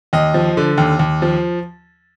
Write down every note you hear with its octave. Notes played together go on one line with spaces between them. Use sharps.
D#2 D#5
F3
D3
D#2
D#2
F3